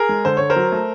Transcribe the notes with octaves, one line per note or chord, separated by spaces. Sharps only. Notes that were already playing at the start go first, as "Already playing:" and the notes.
Already playing: G#4 A#4
G#3
D3 C5
D3 C#5
A#4 C5
F#3
A3